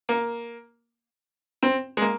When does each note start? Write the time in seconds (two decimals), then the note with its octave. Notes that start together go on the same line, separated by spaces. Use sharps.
0.09 A#3
1.63 C4
1.97 G#3
2.02 A#3